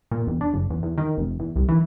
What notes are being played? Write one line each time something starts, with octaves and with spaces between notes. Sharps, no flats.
A#2
E1
D4
F#1
E2
E2
D#3
F1
E2
C2
E3